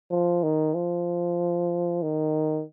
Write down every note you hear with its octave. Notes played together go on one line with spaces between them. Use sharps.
F3
D#3
F3
D#3